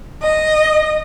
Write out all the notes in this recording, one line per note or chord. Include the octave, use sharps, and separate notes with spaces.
D#5